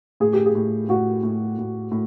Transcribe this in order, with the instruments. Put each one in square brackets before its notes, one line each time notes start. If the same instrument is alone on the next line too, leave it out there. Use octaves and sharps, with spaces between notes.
[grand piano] A2 [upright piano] G#4
[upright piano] G4
G#4
[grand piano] A2
[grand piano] A2 [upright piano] F#4
[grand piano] A2
A2
A2